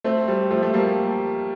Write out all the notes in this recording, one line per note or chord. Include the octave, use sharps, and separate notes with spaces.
A3 C4
G3
F3 A3
A3
G3 A#3